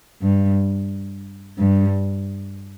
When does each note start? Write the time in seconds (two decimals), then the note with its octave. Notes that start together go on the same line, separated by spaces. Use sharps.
0.22 G2
1.59 G2